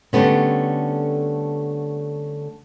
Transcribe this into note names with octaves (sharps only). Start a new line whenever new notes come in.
D3 G3 A3 B3 C#4